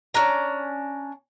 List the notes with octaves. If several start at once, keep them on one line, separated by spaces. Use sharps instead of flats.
C#4 D4 A#5